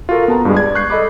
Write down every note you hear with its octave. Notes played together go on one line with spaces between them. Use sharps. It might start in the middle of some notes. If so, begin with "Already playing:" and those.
F4 F#4 A4 A#4
B3 A5 A#5
G2 G3 G#3
D5 G#6
C#6 F#6 G6 C7
A4 D#5 B5 D6